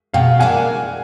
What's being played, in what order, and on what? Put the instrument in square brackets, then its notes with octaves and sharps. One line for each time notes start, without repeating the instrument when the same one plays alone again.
[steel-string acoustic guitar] B2 [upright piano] F5 G5
[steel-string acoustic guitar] F#3 A#3 D4 [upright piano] F#5 G#5